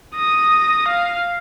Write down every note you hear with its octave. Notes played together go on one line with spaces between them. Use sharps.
D#6 A#6
F5